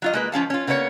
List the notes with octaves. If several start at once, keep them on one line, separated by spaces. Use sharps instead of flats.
F#3 F4 D#5
G#3 A#3 B4
F3 C#4 F5 A5
C#4 F4
C#3 A#3 B3 D4 C#5